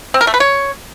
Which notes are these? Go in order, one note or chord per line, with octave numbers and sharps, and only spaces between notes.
C4
A#4
A3
B4
C#5